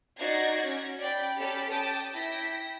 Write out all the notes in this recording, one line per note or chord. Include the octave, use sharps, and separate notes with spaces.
D#4 F#4 D5 G#6 A#6 C7
C#4
D5 G5 B5
C#4 G4 A4 B5 A6
G5 A5 D6 D#6
E4 G5 A#6 B6